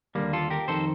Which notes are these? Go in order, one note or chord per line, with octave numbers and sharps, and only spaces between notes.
D#2 D3 G3 A#3
F4 A4
G4 A#4
F2 D#3 A4 C5